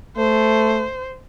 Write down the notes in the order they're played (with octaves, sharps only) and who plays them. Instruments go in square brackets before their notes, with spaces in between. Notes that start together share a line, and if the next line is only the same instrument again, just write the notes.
[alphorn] A3 [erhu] C5